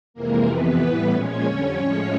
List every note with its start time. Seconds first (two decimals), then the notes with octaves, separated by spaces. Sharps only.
0.14 F2 C3 E3 G#3 A#3 A#4
0.46 F2 C3 E3 B3 B4
0.78 A2 E3 G3
1.10 A#2 F3 G#3 C#4 C#5
1.43 F2 D3 G3
1.75 A2 F3 G#3